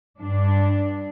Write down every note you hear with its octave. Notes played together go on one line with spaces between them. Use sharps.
G2 D4